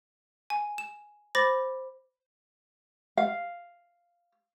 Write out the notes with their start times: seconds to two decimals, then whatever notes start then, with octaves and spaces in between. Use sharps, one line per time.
0.50 G#5
0.78 E7
1.35 C5 B5 D6 A6 A#6
3.17 F5